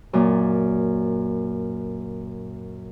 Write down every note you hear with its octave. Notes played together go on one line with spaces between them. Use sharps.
F#2 A#2